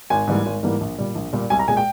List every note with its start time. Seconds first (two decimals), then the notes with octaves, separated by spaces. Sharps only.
0.10 G#1 G#5
0.27 G#2 E3 G3 A#3
0.46 G#1
0.63 G#2 E3 G3 A#3
0.81 A#1
0.98 A#2 G3
1.16 A#1
1.33 A#2 G3
1.50 C2 G#5
1.59 A#5
1.68 A#2 G#3 G#5
1.77 G5